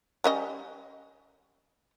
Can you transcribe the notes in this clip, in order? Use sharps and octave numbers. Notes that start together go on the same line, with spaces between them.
G3 C#4 D#5